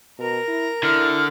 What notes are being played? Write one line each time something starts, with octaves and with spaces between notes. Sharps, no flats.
B2 A#4 A#5
E4
D3 E4 F6